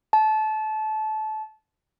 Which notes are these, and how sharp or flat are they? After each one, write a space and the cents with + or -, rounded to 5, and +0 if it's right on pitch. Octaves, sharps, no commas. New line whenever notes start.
A5 -25